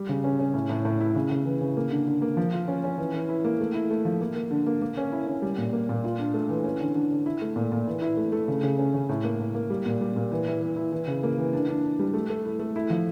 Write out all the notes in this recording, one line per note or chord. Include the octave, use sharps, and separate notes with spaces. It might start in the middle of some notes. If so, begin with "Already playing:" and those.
Already playing: G3
C#3
C#4
C#4
A2
A2
A2
E4
C#3
C#3
E3
C#3
A#3
D3
D3
A#3
F3
F4
C#4
C#4
E3
E3
E4
A#3
A3
E4
A3
F3
A#3
A#3
D3
A#3
A#3
C#4
E4
C#4
G3
A#2
A#3
A#2
F4
D4
A3
E3
C#4
D3
D3
D3
E4
A3
A#2
A#2
E3
E4
A3
A3
C#3
C#3
C#4
C#3
A2
A#3
A2
A#3
G3
A#2
G3
A#2
E3
E4
E3
E4
E3
C#3
A#3
E3
D4
D4
D4
G3
A3
A3
E4
A3
E4
F3